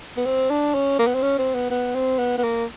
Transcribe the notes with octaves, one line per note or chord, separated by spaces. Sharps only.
B3
C4
D4
C#4
A#3
B3
C4
C#4
C4
B3
B3
C4
B3
B3
A#3